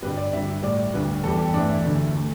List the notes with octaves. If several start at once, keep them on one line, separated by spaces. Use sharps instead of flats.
G2 D3 G3 B4
D5
G2 D3 G3 E5
A2 G3 D5
D2 D3 G3 B4
E2 E3 G3 A4
G4
G2 E3 A3 D4
E4
D2 D3 A3 E4
D3 A3